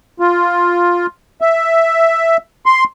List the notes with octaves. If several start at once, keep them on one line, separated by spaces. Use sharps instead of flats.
F4
E5
C6